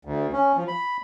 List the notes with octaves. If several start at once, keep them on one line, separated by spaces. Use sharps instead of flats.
D2
C#4
F3
B5